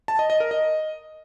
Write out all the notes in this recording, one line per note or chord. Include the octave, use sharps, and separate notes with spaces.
A5
D#5
D#5
A#4
D#5